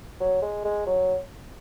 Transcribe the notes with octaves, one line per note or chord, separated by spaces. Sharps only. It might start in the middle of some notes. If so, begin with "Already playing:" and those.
F#3
G#3
G#3
F#3